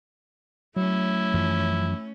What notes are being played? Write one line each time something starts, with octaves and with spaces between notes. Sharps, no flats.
F#3 A3 C#4 E4
F#2 E3 F3